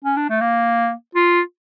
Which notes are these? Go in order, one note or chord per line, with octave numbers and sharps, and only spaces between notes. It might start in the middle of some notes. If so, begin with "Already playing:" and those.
C#4
D4
A3
A#3
F4